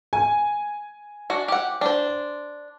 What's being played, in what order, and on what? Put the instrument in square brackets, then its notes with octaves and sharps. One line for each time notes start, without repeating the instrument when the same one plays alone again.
[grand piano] G#5
[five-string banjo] D4 F#4
G4 F#5
D4 C5